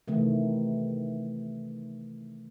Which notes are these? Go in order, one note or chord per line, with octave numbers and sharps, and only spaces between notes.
C3 D#3 E3 A3